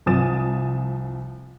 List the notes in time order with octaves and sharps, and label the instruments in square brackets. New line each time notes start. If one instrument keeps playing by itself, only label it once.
[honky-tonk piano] C2 F3 G#5 D#6 A6 E7